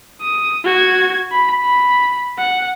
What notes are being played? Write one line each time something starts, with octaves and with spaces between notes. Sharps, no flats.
D#6
F#4 G#6
B5
B5
F#5